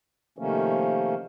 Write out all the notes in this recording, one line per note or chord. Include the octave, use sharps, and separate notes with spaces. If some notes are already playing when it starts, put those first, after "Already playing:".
C3 D#3 F3 A3 A#3 C#4